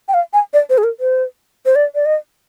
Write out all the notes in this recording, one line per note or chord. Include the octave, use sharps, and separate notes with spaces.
G5
F5
G#5
D5
C5
G#4
A#4
C5
C5
D5
D5
D#5